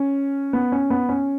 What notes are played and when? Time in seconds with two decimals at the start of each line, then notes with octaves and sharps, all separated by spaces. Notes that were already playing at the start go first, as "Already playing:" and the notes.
Already playing: C#4
0.53 B3
0.72 C#4
0.90 B3
1.09 C#4